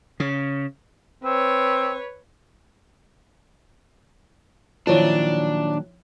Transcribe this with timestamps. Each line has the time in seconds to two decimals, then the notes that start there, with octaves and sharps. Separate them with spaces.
0.20 C#3
1.24 C4 B4 C#5
4.87 A#2 D#3 F3 F#3 D4 E4 C#5